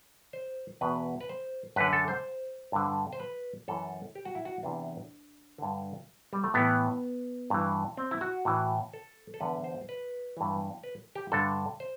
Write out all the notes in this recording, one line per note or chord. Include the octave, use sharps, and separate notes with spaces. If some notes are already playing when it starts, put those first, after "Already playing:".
C5
E2 B2 B4
B4
C5
F#2 D3 B4
A4
C5
G2 D3
C5
B4
F#2 E3 A4
G4
F#4
E4
F#4
E2 C3 E3 D4
G2 D3
G3
A3
A2 E3 B3
G2 E3
C4
E4
F#4
A2 E3
A4
A4
E2 D3 B4
C5
B4
G2 E3
B4
G4
G2 D3 A4
C5